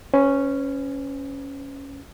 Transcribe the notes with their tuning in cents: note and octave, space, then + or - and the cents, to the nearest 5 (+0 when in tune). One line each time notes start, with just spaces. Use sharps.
C#4 +0 B4 +45